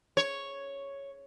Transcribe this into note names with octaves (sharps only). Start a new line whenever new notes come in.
C#5